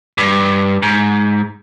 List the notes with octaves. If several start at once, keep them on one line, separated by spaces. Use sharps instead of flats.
G2
G#2